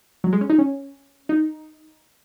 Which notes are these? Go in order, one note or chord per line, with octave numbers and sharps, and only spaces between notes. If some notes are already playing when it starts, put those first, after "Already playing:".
F#3
G#3
C#4
D#4
C#4
D#4